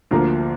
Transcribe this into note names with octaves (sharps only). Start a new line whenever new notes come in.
D2 D3 F3 A#3 A#5